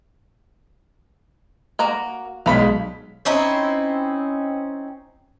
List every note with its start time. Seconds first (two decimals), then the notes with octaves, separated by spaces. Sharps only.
1.79 A#3 F#4 A#5
2.46 B1 G#3 F5 B5 B6
3.25 C4 C#4 D#4 E4